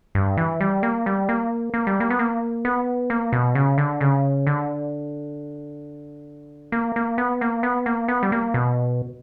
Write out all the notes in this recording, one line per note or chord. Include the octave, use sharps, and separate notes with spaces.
G2
E3
G3
A#3
G3
A#3
A#3
G3
A#3
B3
A#3
B3
A#3
B2
C#3
D3
C#3
D3
A#3
A#3
B3
A#3
B3
A#3
B3
G3
A#3
B2